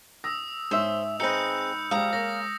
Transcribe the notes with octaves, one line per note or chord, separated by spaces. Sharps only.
D#6 E6 A#6
G#2 C#4 C5 E5
C4 D#4 G#4 B4 D#5 E6 G6 C#7
F3 G3 G#3 F5 A#5 D#6
A#3 C#4 A#6